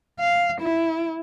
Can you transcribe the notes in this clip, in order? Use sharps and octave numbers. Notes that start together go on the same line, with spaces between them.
F5
E4